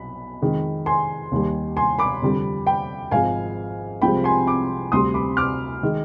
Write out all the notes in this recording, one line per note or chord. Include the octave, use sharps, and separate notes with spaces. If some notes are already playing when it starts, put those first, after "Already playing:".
Already playing: B1 B2 B5
F2 D#3 G#3
G#5 C6
D#2 D#3 G3
G#5 C6
B5 D6
F2 D3 G3
G5 B5
G#1 G#2 F3 G#3 F5 G#5
C2 C3 F3 G#3 G5 B5
G#5 C6
B5 D6
D2 C3 G3 C6 D#6
B5 D6
D6 F6
D#3 G#3